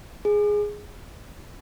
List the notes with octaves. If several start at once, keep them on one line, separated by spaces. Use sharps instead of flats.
G#4